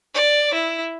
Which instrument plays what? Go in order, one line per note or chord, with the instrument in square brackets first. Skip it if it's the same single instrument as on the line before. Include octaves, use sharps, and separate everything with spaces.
[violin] D5
E4